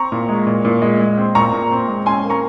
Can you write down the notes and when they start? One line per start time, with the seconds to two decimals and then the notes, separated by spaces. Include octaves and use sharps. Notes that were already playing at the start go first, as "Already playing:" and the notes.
Already playing: C4 A#5 C#6
0.12 A#2
0.29 G#3
0.47 A#2
0.65 A#2
0.82 G#3
1.00 G#3
1.17 C4
1.35 A#2 A#5 C#6
1.53 A#2
1.71 C4
1.88 G#3
2.06 C#4 G#5 C6
2.24 A#3
2.30 A#5 C#6